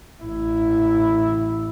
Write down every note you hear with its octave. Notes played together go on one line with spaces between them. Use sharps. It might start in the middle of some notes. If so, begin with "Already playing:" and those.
A1 E4